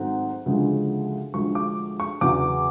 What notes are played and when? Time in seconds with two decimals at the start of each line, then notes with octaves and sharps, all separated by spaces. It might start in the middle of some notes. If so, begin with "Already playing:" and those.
Already playing: G#2 D#3 F#3 A3 C4 F#5
0.46 D2 C#3 F3 G#3
1.34 D2 D3 F3 G#3 C#6
1.55 D6
2.00 C#6
2.21 E2 C#3 F#3 D6